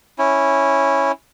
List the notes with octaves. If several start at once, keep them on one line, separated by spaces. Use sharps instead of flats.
C#4 E4